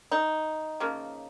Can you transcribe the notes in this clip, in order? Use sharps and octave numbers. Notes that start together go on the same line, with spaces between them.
D#4
C#3 F3 A#3